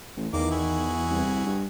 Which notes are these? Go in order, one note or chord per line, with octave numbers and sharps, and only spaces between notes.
A1
E2 D#3 A#3 D6
E4 F#4 G#4
C2
G2